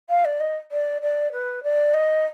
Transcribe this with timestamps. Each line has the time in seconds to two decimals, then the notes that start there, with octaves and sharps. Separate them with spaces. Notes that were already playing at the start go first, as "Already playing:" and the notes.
0.09 F5
0.25 D5
0.40 D#5
0.71 D5
1.02 D5
1.32 B4
1.63 D5
1.94 D#5